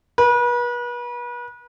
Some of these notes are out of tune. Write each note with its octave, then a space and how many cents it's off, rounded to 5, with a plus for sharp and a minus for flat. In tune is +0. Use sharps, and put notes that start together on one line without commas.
B4 -35